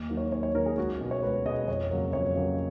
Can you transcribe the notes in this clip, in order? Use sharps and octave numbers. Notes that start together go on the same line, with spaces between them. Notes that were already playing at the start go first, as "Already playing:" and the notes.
Already playing: D#2
D#3 F#3 A#3
C#5
D#2 C#5
C#5
D#3 F#3 A#3 A#4
G#4
C#2 F#4
B2 G#3
C#5
C#2 B4
B2 G#3 D#5
F2 C#5
C#3 F#3 A#3
F2 C#5
C#3 F#3 A#3